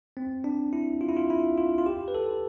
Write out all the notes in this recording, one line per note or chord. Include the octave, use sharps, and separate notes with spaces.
C4
D4
E4
F4
E4
F4
E4
F4
F4
G4
B4
A4